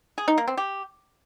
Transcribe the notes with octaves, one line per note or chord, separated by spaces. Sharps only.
G#4
D#4
A#3
C4
G4